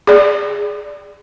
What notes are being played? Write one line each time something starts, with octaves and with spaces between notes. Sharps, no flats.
G#4 D5